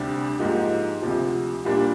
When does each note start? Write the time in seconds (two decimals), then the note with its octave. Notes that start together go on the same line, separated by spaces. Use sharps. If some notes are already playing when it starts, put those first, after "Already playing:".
Already playing: D2 C3 G3 D4 G4
0.39 G#2 F3 A#3 D#4 G4
1.02 D2 C3 F3
1.65 A#2 G3 A#3 D4